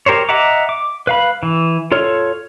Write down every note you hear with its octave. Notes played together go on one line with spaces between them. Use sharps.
G4 A#4 C5 C#5
D#5 E5 F#5 A#5 D6
D6
B4 F5 B5
E3
F4 A4 C#5 F6